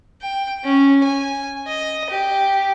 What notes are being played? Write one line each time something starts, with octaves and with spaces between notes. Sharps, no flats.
G5
C#4
G#5
D#5
G4